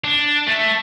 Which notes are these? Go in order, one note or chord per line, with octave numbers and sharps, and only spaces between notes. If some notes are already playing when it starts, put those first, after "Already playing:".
D4
A3